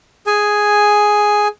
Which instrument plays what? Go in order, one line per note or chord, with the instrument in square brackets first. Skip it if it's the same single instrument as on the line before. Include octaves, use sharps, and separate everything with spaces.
[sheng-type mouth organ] G#4 G#5